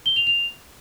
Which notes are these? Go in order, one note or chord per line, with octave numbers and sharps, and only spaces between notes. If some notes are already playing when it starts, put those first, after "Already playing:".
G7
F7
F7